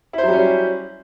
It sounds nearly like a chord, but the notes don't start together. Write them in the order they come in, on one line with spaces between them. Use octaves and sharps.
E4 C5 F#3 G3 C#4